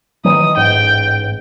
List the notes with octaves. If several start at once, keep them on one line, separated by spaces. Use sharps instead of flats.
D#3 E3 F#3 D#6
A1 G#2 G5